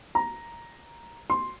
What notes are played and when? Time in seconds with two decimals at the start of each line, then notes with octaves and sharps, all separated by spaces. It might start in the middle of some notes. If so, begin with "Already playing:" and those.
0.15 A#5
1.30 C6